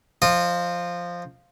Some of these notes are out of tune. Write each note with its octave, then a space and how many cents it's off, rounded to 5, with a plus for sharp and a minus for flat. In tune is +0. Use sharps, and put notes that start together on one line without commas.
F3 +0 F4 +0 D#5 -30